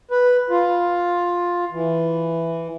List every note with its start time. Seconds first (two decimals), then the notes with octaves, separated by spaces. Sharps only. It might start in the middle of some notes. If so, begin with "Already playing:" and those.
0.11 B4
0.50 F4
1.72 E3